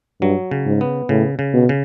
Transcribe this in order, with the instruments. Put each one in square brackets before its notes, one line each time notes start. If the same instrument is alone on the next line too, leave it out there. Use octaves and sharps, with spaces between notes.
[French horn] G2 [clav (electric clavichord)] F#3
[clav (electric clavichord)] C#3
[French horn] G#2
[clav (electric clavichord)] B3
[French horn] A2 [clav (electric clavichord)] C#3
[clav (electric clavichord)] C#3
[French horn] B2
[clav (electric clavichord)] C#3